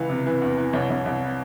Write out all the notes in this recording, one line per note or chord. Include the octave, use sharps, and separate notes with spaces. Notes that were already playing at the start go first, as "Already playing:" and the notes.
Already playing: C#2 E3 F5
C3
E3
E2
E3
C2 C#5
C2
C2